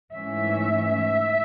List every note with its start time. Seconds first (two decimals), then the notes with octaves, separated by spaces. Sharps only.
0.13 G#2 E3 A3 C#4 E5